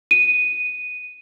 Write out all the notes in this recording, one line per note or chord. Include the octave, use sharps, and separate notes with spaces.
D#7